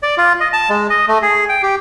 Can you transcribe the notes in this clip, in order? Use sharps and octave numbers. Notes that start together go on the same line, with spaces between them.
D5
F4
D#5
A5
G#3
D#5
A3
G#4
G5
G4